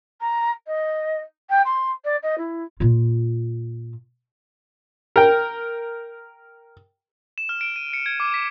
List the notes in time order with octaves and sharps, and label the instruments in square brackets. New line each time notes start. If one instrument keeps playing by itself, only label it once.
[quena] A#5
D#5
G5
C6
D5
D#5
E4
[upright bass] A#2 F4
[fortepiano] A#4 G5
[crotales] E7
F6
D7
D#7
C#7
G#6
D6
B6